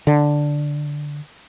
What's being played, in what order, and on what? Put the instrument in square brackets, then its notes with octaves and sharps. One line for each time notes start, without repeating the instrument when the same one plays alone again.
[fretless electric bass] D3